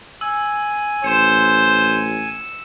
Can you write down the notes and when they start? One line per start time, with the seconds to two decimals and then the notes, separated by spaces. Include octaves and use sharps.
0.21 G#5 E6
1.04 A1 C5 C#7 E7